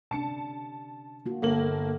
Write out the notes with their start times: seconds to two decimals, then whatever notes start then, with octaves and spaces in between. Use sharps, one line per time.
0.11 C3 C#4 D4 A5 C#7
1.26 A#3 F4 F#4
1.42 G1 A#3 A4 F#7